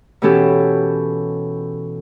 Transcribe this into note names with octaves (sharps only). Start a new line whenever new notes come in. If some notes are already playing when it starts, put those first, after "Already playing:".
B2 E3 B3 C#4 G4 A4